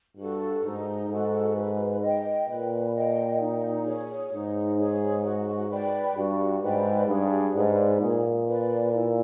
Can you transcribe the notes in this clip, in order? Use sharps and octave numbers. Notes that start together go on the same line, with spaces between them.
G2 F#4 A4
G#2 D#4
G#2 F#4 A4
B4
D#5 G5
A#2 B4
D#5 G5
D#4
G#4 C#5
G#2 D#4
G#4 C#5
F#4
B4 D5 G5
G2 F#4
G#2 B4 D5 G5
G2 G#4
G#2 B4 D5
A#2 G#4
B4 D5
E4